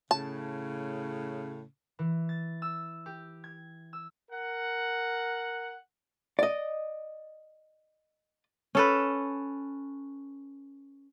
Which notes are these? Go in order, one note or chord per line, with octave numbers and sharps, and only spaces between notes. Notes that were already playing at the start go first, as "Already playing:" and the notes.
A2 C#3 A5
E3
A6
E6
G4
G#6
E6
A#4 F#5
D5 D#5
C#4 A4 B4